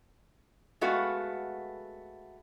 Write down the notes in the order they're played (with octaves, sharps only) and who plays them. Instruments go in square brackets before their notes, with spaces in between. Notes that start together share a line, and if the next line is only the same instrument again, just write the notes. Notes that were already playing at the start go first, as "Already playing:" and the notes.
[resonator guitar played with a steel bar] G#3 A3 B3 F#4 F5